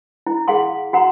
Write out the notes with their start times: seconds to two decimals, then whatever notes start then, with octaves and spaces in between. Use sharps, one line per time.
0.27 E4
0.48 G#4 F5 F#5 C6
0.93 F#4 F#5 A#5 C6